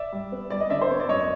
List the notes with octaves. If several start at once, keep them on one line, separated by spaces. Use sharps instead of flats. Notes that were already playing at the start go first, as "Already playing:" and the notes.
Already playing: D5 E5
G3
B3
G3 D5
D#5
D3 D5 E5
C5
B3 C#5
D5
F#2 C#5 D#5